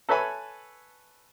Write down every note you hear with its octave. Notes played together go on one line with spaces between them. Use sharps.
A4 B4 C#5 E5 G#5 B5